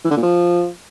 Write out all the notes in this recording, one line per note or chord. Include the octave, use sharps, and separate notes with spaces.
E3
D3
A#2
F3